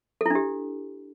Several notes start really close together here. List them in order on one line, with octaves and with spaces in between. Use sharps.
A4 E4 D4 G4